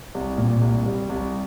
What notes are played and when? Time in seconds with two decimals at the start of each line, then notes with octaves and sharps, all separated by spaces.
0.15 C2
0.38 A#2
0.61 C2
0.86 G3
1.09 C2